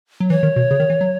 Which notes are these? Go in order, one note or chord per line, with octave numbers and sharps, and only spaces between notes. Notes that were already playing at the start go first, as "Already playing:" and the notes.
F#3
E3 C#5
D#3
B2
C#3
D#3
E3
F#3